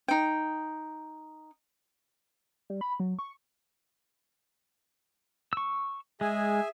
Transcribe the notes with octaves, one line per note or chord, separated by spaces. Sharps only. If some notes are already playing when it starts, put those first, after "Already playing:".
D#4 G5
G3
B5
F#3
C#6
C#6 E6
G#3 G#4 E5 G#5